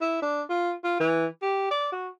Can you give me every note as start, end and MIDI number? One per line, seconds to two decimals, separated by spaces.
0.01 0.22 64
0.22 0.42 62
0.49 0.73 65
0.84 0.97 65
1.00 1.26 52
1.42 1.69 67
1.71 1.92 74
1.92 2.09 66